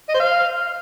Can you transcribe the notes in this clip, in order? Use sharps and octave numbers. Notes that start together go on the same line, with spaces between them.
D#5
C5
F5